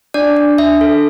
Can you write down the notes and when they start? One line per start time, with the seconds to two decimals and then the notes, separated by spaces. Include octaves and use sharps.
0.14 D4 D5
0.37 D4
0.58 D4 E5
0.81 A4